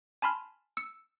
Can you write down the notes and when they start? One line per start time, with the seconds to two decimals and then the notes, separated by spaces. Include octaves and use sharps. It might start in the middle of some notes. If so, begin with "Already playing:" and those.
0.22 G#5 A5 B5 C6 F6
0.77 E6 C#7